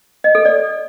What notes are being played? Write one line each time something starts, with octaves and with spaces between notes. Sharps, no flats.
D#5
A4
D5